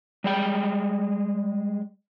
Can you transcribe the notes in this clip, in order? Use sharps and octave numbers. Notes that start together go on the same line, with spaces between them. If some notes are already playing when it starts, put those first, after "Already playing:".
G3 G#3 G5